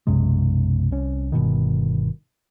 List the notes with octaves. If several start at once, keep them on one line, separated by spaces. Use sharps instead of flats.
B1 F#2 C3 G#3
C2 C#4
G1 C2 B2 D#3